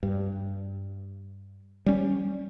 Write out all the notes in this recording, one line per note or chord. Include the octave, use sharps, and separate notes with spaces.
G2
G3 C#4